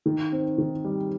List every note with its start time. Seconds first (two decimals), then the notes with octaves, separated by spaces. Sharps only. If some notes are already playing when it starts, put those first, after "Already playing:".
0.06 D#3
0.32 C4
0.58 D#3
0.84 G3